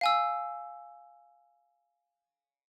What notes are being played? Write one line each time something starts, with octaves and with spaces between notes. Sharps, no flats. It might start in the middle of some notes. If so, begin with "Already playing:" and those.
F5 G#5 E6